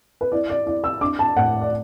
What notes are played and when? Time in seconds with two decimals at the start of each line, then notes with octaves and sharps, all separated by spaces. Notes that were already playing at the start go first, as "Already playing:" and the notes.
0.21 B4
0.32 E4 D5
0.50 D5
0.66 E4 D5
0.84 E6
1.01 D4 D6
1.19 A5
1.36 A2 F#5
1.61 D5